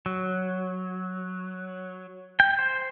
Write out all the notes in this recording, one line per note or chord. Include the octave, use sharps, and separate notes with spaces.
F#3
G5
C5